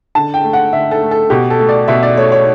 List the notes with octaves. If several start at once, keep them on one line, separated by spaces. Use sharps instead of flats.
D3 A5
G5
A3
F#5
D3 E5
A4
A3
A4
B2 G4
A4
A3
D5
B2 E5
D5
A3 C#5
C#5